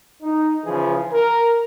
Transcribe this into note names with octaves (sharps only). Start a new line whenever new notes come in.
D#4
C#3 E3 F3 G#4
A#4